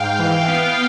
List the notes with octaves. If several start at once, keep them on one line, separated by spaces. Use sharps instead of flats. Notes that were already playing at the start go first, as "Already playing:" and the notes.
Already playing: G#2 F5 G5
E3
B3